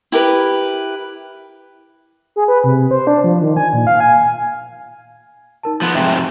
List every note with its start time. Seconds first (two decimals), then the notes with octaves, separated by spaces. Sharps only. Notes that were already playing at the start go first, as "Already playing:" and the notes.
0.12 E4 G4 A#4 B4
2.36 G#4
2.48 B4
2.64 C3
2.91 C5
3.07 D4
3.24 F3
3.41 D#3
3.57 G#5
3.73 A#2
3.87 F5
4.00 G#5
5.63 D#4 A#4 A5
5.82 F3 B3
5.95 F2 G#2 C3 E5 G5 C6